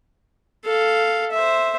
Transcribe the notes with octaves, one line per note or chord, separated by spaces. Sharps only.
A4 F5
C5 E5